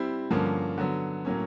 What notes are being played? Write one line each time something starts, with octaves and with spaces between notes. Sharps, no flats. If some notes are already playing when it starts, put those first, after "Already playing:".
Already playing: G3 C4 E4
G2 D3 F3 A#3 C#4
D3 F#3 B3
A2 F#3 A#3 C#4